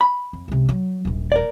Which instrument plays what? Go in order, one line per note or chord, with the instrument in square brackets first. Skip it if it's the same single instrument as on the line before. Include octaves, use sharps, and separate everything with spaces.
[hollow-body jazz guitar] B5
[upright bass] F2
C#2 C3
F#3
D#1 A#1
[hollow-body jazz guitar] A#4 D5